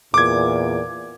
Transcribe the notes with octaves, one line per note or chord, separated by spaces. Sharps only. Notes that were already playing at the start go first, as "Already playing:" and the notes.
E2 A#2 D6 G#6